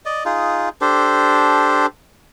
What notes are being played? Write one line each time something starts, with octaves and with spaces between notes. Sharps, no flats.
D5 D#5
D#4 F4 G#4
D4 G4 A4 C5